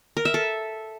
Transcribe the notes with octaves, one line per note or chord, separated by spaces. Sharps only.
A#4
E5
A4